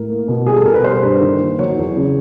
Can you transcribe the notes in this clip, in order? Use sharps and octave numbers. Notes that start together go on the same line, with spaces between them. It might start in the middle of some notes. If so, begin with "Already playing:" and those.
Already playing: A2 A#4
A#3
B2
G3 G#4
A4
B2 A#4
B4
G3 C5
G2
D#3
A#3
F#3 C#5
E2
C#3